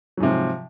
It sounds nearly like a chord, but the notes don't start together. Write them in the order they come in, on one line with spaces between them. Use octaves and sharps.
F#3 G#2 C3 F3